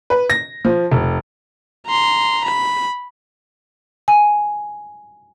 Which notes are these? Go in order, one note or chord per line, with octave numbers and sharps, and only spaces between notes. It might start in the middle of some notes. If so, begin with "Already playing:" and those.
B4
A#6
F3
F1
A#5 C6
B5
G#5